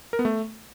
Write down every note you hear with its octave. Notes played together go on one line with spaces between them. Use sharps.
A#4
B3
A3